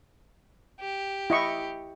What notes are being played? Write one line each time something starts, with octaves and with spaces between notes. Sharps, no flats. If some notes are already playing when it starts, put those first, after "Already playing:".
G4
E4 D#5 C#6